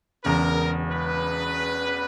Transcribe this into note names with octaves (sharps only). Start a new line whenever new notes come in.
E1 E2 C#3 A#4
B4